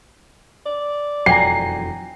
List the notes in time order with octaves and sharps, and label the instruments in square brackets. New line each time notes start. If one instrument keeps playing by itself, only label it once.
[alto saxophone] D5
[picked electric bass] E1 F2 F#3 [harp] G5 G#5 A#5 [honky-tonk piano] C7